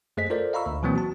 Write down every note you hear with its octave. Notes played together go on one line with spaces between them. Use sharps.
F#2 A3 G#4 C5 D#5 B6
F4 A4 A#4 C5 D5
D#5 F5 A#5 B5 C#6 E6
D2
B2 E3 F#3 A#3 C4
F#4 A5